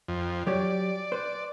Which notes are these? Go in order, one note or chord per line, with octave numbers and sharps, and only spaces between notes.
F2
F#3 G4 C#5 D5
B4 C5